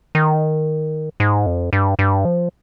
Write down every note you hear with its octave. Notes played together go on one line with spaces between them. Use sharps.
D#3
G#2
F2
G2
G2
F3